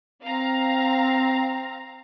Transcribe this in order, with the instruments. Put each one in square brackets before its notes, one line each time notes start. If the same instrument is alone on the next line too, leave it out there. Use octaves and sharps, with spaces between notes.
[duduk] C4 [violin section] F5 A#5